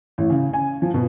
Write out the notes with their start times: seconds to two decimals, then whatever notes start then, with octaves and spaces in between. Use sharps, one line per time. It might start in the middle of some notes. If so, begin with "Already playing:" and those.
0.18 A1
0.30 C#3
0.53 G#5
0.82 F3
0.94 B2